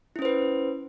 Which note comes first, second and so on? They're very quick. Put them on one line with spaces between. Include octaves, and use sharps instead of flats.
E4 C#4 C5 B4